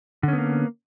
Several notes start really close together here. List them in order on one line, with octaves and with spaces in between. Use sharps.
D3 C#4 B3 A#3